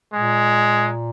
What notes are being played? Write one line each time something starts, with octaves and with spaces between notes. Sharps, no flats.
A#2 G#3